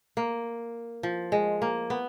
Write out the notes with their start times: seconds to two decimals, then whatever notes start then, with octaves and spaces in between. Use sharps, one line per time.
0.17 A#3
1.03 F3
1.32 G#3
1.62 A#3
1.90 B3